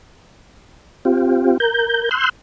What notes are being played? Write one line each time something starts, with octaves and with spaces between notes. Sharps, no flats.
C4 F4 G4
A#4 G6
C6 E6 F#6 G6